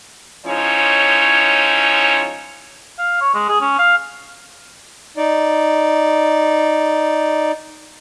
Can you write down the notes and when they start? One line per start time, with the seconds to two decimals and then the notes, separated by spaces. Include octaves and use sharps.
0.46 F3 G#3 C#4 D#4 E4 C#5
2.98 F5
3.21 C#5
3.34 G#3
3.49 G#4
3.61 C#4
3.79 F5
5.17 D#4 D5